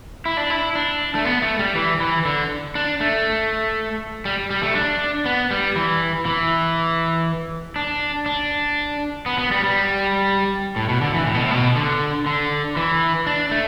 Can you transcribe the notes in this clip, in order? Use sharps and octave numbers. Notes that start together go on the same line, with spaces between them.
E4
D4
E4
D4
A3
B3
A3
G3
E3
E3
D3
D4
A3
G3
G3
A3
D4
B3
G3
E3
E3
D4
D4
B3
B3
G3
G3
A2
B2
D3
E3
A2
B2
A2
B2
D3
D3
E3
D4
A3